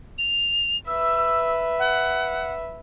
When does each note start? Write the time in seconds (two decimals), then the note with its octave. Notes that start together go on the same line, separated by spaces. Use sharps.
0.18 F7
0.87 B4 E5 E6
1.79 F#5